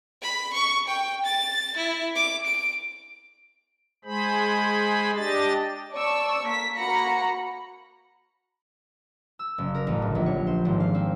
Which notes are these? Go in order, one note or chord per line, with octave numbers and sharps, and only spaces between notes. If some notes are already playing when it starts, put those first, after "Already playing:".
B5
C#6
G5
A6
E4
D6
D7
G#3 G#4 C5 B5
D4 G4 D#5 A6
D5 A5 C#6 E6
A#3 B6
A#3 F#4 A#5 B5 A#6 C#7
E6
F#1
A#4
A1
G1
A#1
C#5
C5
G#1
F5
C4